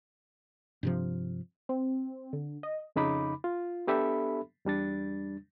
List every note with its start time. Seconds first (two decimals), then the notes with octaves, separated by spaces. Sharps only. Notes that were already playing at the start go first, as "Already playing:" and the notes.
0.83 G2 C3 F3
1.69 C4
2.33 D3
2.63 D#5
2.96 F2 C#3 D#4 B5 D6
3.44 F4
3.87 B3 D4 G4 A4 E5 B5
4.65 E2 G3 D4 A6